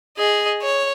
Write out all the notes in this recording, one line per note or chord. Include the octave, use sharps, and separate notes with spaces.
G#4 D#5
C#5